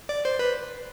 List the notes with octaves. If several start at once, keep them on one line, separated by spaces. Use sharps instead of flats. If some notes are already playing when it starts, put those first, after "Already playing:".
D5
C5
B4